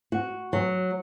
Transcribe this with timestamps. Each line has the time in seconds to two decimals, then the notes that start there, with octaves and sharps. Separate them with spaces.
0.12 F#4
0.53 F#3